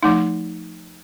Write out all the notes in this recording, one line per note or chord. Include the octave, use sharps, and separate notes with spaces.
F3 A3 D#4